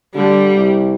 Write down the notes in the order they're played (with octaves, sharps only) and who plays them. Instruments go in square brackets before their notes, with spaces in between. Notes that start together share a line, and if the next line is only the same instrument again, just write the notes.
[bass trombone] D3 [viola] G3
[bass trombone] C2